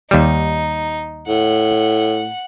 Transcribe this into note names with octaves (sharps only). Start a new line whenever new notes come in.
D#2 G3 D#4
A2 F#5